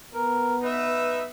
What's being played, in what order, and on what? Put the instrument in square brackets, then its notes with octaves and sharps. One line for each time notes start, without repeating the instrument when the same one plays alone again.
[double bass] B3 [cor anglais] A#4
[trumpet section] D#4 E5 [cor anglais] B4